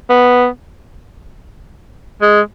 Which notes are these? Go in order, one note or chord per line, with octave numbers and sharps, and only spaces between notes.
B3
G#3